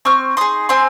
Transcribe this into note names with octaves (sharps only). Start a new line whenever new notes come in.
C4 C#6 F6
D#4 G#4 C6 D#6
C4 G#5 C6